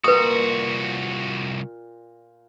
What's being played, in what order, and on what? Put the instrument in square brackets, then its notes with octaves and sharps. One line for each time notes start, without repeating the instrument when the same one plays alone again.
[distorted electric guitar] C2 F#4 [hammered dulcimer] A#2 [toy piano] B4 D#6